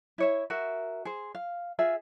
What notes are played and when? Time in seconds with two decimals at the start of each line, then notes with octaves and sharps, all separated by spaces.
0.18 E4 C#5 E5
0.50 F#4 A#4 E5
1.05 G#4 C5
1.35 F5
1.79 F4 G#4 E5